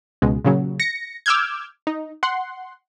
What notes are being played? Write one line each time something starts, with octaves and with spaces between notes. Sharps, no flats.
C#2 B2 G#3
A#2 C#3 F#3
A#6 C#7
D6 E6 F6 G6 G#6
D#4
F#5 C6